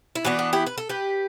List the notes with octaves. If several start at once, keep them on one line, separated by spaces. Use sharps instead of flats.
E4
E3 B3 D4 F#4
F#4
E4 G4
B4
A4
G4 B4